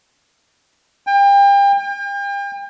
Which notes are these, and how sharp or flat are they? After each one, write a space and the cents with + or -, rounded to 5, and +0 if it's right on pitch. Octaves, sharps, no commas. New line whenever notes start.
G5 +35
G5 +40